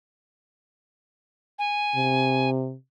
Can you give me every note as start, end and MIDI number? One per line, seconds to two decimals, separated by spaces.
1.59 2.49 80
1.96 2.74 48